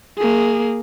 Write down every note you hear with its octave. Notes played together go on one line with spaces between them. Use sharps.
A#3 G#4